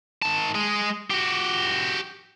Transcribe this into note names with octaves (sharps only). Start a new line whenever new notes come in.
D#3 A5
G#3 G#4
F#4 G4